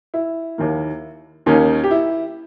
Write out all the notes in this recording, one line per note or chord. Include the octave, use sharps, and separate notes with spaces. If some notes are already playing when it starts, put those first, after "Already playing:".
E4
D#2 D#3 A#3
D#2 D#3 A#3 C#4 D#4
G4
E4